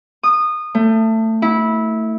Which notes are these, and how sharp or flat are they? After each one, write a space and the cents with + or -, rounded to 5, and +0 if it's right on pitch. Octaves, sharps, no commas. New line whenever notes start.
D#6 -20
A3 +20
E4 -20